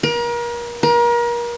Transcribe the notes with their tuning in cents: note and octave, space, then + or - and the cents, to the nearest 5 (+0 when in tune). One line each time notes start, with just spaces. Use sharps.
A#4 +35
A#4 +35